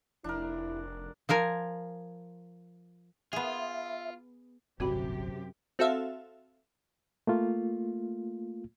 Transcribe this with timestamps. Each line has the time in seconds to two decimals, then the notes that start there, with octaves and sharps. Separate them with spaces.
0.24 F1 D4 E4 A#4
1.29 F3 F4 A#4 G#5
3.33 B3 F4 G#4 E5
4.80 D1 G1 F#2 C3 C4 F#4 G4 B5
5.79 C4 F#4 A4 E5 F5
7.27 A3 A#3 F4